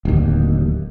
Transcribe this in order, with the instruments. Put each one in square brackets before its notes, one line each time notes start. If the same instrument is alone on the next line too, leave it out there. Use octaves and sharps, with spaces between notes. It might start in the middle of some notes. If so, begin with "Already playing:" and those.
[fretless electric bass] D1 D#2